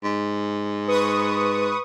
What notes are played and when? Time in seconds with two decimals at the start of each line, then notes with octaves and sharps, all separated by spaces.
0.04 G#2
0.87 B4 C#6 D#6